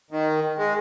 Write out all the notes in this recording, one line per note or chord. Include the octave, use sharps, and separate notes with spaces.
D#3
G#3